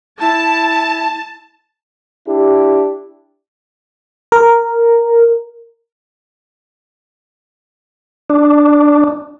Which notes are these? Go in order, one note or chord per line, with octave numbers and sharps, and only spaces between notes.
E4 A5
D4 E4 G4
A#4
D4